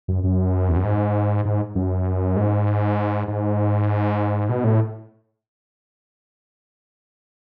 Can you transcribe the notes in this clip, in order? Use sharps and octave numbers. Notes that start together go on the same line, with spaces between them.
F#2
F#2
E2
F#2
G#2
G#2
F#2
G#2
G#2
B2
A2